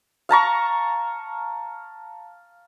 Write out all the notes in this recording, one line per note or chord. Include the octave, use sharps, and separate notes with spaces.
F5 A5 A#5 C#6